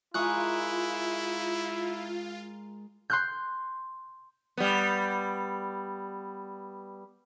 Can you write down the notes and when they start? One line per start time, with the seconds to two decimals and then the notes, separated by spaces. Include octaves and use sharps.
0.14 G#3 E4 F4 A#4 E5 C#6 D#6 F#6
3.10 C6 F#6 G6
4.57 G3 B3